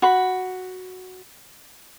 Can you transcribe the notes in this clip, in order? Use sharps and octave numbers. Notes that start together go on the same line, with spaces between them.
F#4 B5